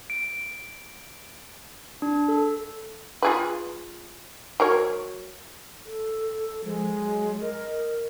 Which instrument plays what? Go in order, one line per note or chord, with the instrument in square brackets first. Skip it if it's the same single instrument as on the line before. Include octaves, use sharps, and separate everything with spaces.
[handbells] D7
D4
A4
[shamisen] F4 G#4 B4
F#3 A#4 C#5
[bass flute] A4
[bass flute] F3 [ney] G#3
[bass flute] F#3
[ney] A#4 [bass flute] D#5